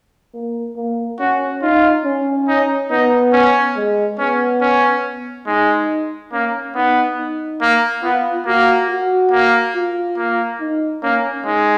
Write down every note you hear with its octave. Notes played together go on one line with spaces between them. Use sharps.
A#3
A#3
C#4 F#4
D#4 F4
C#4
D#4
B3 D#4
C#4
G#3
B3 C#4
C#4
G#3 D#4
A#3 C#4
B3 D#4
D#4
A#3
B3 F4
A#3 F#4
F#4
A#3
F4
A#3
D#4
A#3 C#4
G#3 D#4